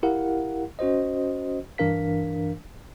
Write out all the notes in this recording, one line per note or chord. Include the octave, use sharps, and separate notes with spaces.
E4 G4 A#4 F5 F#5
C#4 F#4 C5 D#5
G2 E3 D4 A#4 F5 B6